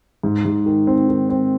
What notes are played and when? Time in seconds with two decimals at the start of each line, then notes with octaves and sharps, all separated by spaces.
0.23 G#2
0.45 G#2
0.66 D#3
0.87 C4
1.09 D#3
1.30 C4